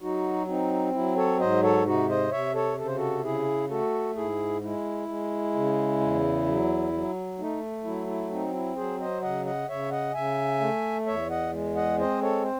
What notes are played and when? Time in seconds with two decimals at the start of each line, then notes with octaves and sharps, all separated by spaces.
0.01 F#3 D#4 F#4
0.48 C4 D#4
0.93 F#3 E4
1.16 A4 C#5
1.40 G#2 C5 D#5
1.63 A4 C#5
1.86 C3 D#4 F#4
2.09 C5 D#5
2.31 C3 C#5 E5
2.54 A4 C#5
2.78 C#3 A4
2.87 C5
2.96 F#4 A4
3.24 C#3 E4 G#4
3.70 A3 F#4 A4
4.16 G#2 E4 G#4
4.62 G#3 E4
5.08 G#3
5.55 C#3
6.00 E2
6.46 F#3
6.93 F#3
7.39 A3 D#4
7.84 F#3 E4
8.07 E4
8.30 C4 D#4
8.53 E4
8.76 F#3 G#4 C5
9.00 C5 D#5
9.22 C#3 D#5 F#5
9.46 D#5 F#5
9.69 C#3 C#5 E5
9.91 D#5 F#5
10.14 C#3 E5 G#5
10.60 A3
11.06 E2 C#5 E5
11.30 D#5 F#5
11.52 G#3
11.76 D#5 F#5
11.98 C4 C5 D#5
12.22 A4 C#5
12.44 C5